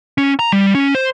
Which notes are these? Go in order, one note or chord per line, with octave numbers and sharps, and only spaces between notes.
C#4
A#5
G3
C#4
C5